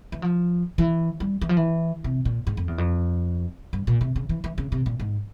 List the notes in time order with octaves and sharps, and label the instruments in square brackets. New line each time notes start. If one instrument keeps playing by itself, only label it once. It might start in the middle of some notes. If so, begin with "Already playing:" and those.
[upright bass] E3
F3
E3
G3
E3
F3
E3
C3
A#2
G#2
F2
E2
F2
G2
A#2
C3
C#3
E3
E3
C#3
C3
A#2
G#2